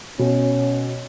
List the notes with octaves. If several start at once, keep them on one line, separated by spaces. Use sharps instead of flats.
B2 C#4